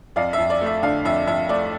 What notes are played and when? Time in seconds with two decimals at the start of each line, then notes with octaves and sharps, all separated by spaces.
0.16 F2 D5 F5
0.33 E5
0.38 F2
0.50 D5
0.61 A3 E5
0.83 D3 D5 F5
1.05 F2 E5
1.27 F2 E5
1.49 A3 D5